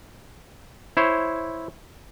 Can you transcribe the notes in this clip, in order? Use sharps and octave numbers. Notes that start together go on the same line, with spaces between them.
E4 C5 C#5